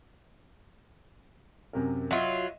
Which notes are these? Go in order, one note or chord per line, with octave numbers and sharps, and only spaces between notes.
F#2 C3 A#4
F#3 F4 D#5 E5